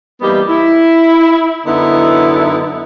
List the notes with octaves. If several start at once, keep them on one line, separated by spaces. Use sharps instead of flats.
E3 G3 A#3 B3 D#4 G4
E4
F#2 D3 B3 D#4 E4